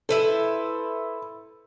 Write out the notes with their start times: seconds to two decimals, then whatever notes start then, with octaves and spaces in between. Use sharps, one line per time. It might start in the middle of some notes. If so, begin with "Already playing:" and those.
0.09 E4 A4 B4 C5